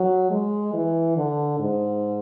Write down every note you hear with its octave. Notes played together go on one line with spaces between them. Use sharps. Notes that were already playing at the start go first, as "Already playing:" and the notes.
Already playing: F#3
G#3
E3
D3
G#2